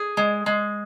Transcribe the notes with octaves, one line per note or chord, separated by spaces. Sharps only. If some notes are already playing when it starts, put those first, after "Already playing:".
Already playing: G#4
G#3
G#3